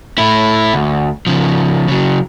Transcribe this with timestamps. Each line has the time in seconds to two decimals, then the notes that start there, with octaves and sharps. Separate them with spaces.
0.18 A3 E4
0.74 D2
1.27 C#3 F3
1.88 C#3 F#3